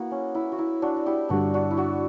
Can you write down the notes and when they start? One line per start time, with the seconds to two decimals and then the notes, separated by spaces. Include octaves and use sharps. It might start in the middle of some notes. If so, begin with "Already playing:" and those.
Already playing: A#3 B3 E4 F#4
0.11 C#4
0.35 E4
0.52 F#4
0.59 E4
0.82 D4 F#4
1.06 E4 G4
1.29 G2 D3 G3 D4 F#4
1.54 D4 F#4
1.71 E4
1.77 D4 F#4